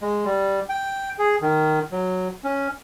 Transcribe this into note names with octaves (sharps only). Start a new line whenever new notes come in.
G#3
G3
G5
G#4
D#3
F#3
C#4